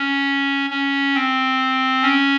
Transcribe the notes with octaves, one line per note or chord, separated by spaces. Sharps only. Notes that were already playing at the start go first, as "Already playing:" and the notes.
Already playing: C#4
C#4
C4
C#4